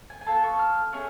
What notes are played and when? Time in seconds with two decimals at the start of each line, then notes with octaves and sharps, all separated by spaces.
0.10 G#5
0.21 G#5
0.26 B3 F4 A4 A5
0.43 C#6
0.59 F6
0.93 A3 C#4 G#4